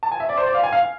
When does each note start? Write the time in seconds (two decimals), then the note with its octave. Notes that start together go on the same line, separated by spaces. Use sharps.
0.03 A5
0.12 G#5
0.20 E5
0.29 D5
0.37 C5
0.47 D5
0.54 F5
0.63 G#5
0.73 F5